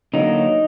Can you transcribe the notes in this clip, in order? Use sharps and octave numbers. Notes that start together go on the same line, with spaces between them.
D3 F#3 A#3 D#4